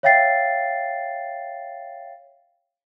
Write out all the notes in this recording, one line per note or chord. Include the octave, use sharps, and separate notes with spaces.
C#5 E5 F5 G5 A6 C7